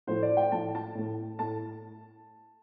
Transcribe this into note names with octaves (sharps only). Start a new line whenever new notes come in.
A2 F3 A3 C5
D5
G5
A2 F3 A3 A5
A5
A2 A3
A2 A3 A5